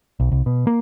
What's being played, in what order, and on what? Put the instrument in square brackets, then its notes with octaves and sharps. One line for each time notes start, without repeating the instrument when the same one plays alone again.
[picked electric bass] B1
C2
B2
A#3